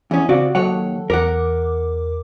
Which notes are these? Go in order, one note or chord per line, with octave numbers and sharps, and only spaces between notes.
E2 C#4 E4 D#6
C#3 C4 F#4 D5 F5 D6
D#2 F#3 A4 C#5 F#5
E2 A#4 F#5 D6